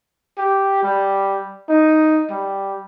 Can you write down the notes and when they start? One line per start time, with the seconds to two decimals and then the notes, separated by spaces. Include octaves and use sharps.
0.38 G4
0.83 G3
1.69 D#4
2.30 G3